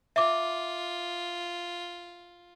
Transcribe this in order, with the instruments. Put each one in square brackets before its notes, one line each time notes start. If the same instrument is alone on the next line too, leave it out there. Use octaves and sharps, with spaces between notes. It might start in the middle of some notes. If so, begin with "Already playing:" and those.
[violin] F4 [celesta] E5 D6